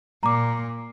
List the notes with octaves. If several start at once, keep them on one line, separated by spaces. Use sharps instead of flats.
A#2 A#5 D6